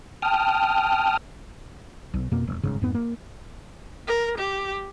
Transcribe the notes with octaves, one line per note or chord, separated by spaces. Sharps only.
G5 A5 D#6 F6
B1
F2 B2 A#3
E1
G1 G#2 C#3
F2 G#2 B3
A#3
A#4
G4